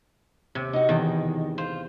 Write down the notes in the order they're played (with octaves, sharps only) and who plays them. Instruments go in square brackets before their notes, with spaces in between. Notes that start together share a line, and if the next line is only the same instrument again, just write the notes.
[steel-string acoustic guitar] D#2 [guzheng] C3
[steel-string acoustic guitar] D#4 F#4
[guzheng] E2 [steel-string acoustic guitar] B2 D#3
[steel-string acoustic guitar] F4 [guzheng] C5